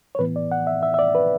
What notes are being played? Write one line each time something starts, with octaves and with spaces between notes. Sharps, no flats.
C#5
A2 E3 B3 B4
D5
F#5
E5
E5
E5
D5
B4